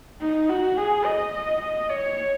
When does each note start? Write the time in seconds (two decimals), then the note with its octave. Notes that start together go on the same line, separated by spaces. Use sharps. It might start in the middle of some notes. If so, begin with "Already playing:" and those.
0.22 D#4
0.50 F#4
0.77 G#4
1.05 D#5
1.34 D#5
1.61 D#5
1.89 C#5